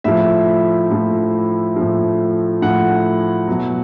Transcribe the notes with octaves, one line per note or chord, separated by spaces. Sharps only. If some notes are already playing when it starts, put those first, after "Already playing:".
A2 F3 E5
A2 F3
A2 F3
A2 F3 F#5
B2 F#3